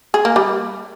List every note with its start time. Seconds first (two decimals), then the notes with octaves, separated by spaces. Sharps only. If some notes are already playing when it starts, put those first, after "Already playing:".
0.14 G#4
0.25 A#3
0.36 G3